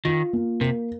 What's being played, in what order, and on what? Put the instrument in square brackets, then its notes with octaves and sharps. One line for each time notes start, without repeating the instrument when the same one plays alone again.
[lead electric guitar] D#3 [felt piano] F4
[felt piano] A#3
[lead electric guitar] C3 [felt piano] A#4